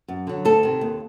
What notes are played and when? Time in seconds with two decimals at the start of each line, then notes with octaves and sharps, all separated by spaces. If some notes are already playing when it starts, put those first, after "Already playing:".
0.08 F#2
0.27 D3 F#3
0.45 D2 A4
0.63 C3 D#3
0.81 D#2